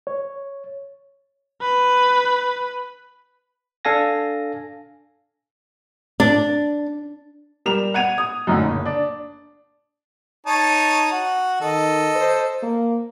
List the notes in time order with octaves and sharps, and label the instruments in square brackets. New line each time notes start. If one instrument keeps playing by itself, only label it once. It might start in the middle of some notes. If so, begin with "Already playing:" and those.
[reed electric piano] C#5
[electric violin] B4
[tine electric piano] D4 A4 F5 G#5 A#6
[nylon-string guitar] D4
[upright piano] G3 A#4 E7 F7
F#5 G#6 D#7 F7
D#6
F#2 A2 D3 D#4
F#1
D4
[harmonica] D#4 C#5 A5
F#4
[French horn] D#3 [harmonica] A4 D#5
[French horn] C5
A#3